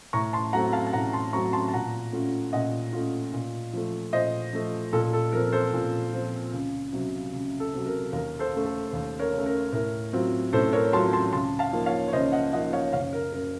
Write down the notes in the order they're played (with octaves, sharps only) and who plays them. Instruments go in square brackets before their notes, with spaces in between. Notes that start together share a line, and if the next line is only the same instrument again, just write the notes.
[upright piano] A2 A#5 C#6
A5 C6
F#3 A3 C4 F#5 A#5
F5 A5
A5
A2 F#5 A#5
A5 C6
F#3 A3 C4 A#5 C#6
A5 C6
A5
A#2 F#5 A#5
A3 C#4 F4
A#2 D#5 F#5
A3 C#4 F4
A#2
F3 A3
A#2 C5 D#5
F3 A3
A#2 A4
A4
F3 C4 A#4
A4 C5
A#2
F3 C4
C#2
C3 F#3
C#2
A4
C3 F#3
A#4
D#2 A#4
A4 C5
C#3 A3
A4
D#2
A#4 C#5
C#3 A3
A#4
A2 A#4
F#3 C4 F4
A2 A4 C5
A#4 C#5
F#3 C4 F4 A5 C6
A5 C6
C#2 A5 C6
F5 A5
C#3 F3 A#3 D#4
C#5 F5
C#5
C#2 C5 D#5
D#5 F#5
C#3 F3 A#3 D#4 D#5 F#5
C#5 F5
F#1 C#5 F5
A#4
F#2 C#3 A#4